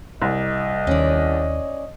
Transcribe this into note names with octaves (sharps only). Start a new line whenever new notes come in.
C2 D#5
D#2 D#3 C#4 D5